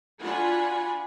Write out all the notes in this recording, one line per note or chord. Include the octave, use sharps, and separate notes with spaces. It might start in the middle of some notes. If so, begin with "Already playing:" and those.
D4 F4 F#4 F#5 G#5 B5